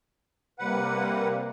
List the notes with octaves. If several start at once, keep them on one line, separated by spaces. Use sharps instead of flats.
C3 G3 A#3 B4 F#5